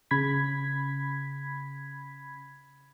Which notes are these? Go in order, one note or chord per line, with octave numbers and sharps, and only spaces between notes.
C#3 B5 G#6 B6